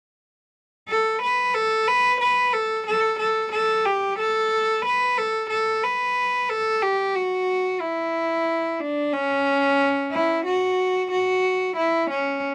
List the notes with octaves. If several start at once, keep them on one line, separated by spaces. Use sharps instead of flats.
A4
B4
A4
B4
B4
A4
A4
A4
A4
G4
A4
B4
A4
A4
B4
A4
G4
F#4
E4
D4
C#4
E4
F#4
F#4
E4
C#4